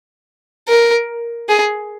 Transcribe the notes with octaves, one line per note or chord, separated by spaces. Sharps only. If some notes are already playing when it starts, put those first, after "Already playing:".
A#4
G#4